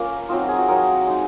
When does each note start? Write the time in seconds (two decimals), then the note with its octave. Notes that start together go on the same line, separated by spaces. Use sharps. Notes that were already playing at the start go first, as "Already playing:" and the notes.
Already playing: A#3 C#4 F4 A#4
0.29 F#3 C4 D#4 F4
0.39 F#4
0.48 G#4
0.58 F#4
0.68 F#3 C4 D#4 A#4
1.07 G#3 D#4